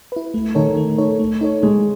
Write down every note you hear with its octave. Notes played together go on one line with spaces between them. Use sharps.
E4 B4
A3
D#3 D#4 A4 C#5
A3
D#4 A4 C#5
A3
D#4 A4 C#5
G#3 A3